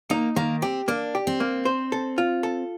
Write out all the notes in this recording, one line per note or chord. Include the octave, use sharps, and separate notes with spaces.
A#3 D#4
D#3 A#3
C4 G4
A#3 D4
G4
C4
A#3
C5
A4
F4
A4